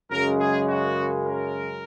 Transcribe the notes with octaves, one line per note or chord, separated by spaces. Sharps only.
F#2 C#3 G#3 A#4
G#4
F#4
A#4